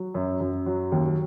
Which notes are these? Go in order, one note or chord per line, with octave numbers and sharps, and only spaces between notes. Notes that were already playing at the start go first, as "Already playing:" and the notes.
Already playing: F#3
F#2
F#2
F#3
D#2